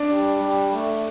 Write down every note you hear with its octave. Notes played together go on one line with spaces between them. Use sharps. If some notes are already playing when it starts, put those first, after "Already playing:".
Already playing: D4
G3
G3
A3